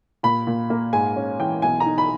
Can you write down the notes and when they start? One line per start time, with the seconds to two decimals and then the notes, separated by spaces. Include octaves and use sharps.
0.23 A#2 B5
0.47 A#2
0.70 A#3
0.93 G#2 G#5
1.16 C#4
1.39 E3 G5
1.62 B1 G#5
1.80 A#5
1.86 D#4
1.98 B5